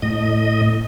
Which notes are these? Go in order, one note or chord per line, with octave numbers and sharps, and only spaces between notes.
A2 D#5